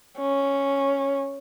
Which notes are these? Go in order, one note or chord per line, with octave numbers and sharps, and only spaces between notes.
C#4